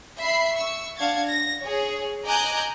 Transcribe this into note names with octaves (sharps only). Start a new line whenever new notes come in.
E5 B5 C7
C#6 E6
D4 F5 F#5 G#6 A6
A#6
G#4 C#5
D#5 G#5 A#5 D6 F#6 G6